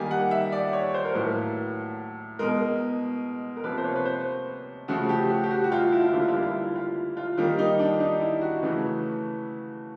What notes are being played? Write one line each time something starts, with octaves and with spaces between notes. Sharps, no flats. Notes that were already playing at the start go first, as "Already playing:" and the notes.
Already playing: D#3 G3 A#3 G#5
F#5
E5
D5
C#5
C5
A#4
A2 F#3 A#3 B4
B2 G#3 A#4
A#4
C3 F3 A#3 B4
C5
C#5
B4
C5
C#3 F3 A3 F#4
G4
F#4
G4
F#4
F#4
F4
E4
F4
E4
D3 G3 A#3 F4
E4
F4
E4
F4
E4
F4
F4
D#3 G3 A#3
D#4
D4
D#4
E4
F#4
C#3 E3 A3